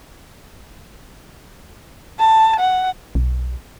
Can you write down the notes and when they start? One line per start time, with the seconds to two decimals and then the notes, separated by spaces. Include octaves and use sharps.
2.20 A5
2.60 F#5
3.15 B1